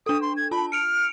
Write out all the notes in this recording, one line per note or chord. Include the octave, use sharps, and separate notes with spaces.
D4 A4 D#6
C6
G#6
F4 A5 B5
F6 C#7 D7 F7